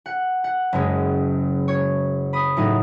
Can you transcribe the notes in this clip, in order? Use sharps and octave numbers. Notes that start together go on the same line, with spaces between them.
F#5
F#5
F#1 F#2 G#3
C#5
B5 D#6
A2 F#3 D#4